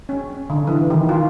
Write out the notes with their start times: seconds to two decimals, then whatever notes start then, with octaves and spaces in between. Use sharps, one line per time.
0.09 C#4
0.50 D3
0.67 E3
0.90 D#3
1.09 F4